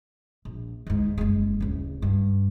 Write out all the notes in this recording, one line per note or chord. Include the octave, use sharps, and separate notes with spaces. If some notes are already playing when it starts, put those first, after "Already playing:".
A#1
D2 G#2
F#1 G#3
D1 C#3
G2